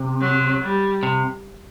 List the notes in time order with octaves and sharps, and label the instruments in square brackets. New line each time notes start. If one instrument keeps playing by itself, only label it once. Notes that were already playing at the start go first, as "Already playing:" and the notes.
Already playing: [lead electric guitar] C3
[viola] F#3
G3
[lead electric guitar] C3